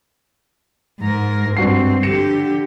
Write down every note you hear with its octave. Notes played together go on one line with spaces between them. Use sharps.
G#2 A#4
G2 C4 F#4 C7
D3 G4 A#6 C#7 E7